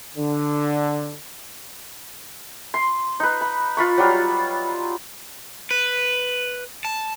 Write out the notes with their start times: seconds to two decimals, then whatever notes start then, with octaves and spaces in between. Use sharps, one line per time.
0.17 D3
2.74 C6
3.20 D#4 B4
3.41 B5
3.77 F4 B5 C#6
3.98 F#3 G3 F4
5.71 B4
6.85 A5